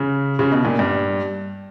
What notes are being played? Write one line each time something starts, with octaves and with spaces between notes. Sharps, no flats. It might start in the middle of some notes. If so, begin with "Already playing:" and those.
Already playing: C#3
C#3
B2
A#2
G2